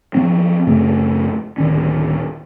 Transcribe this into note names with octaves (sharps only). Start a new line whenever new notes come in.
F3 B3 C4
F#2 C#3 A3
D1 D#3 C#4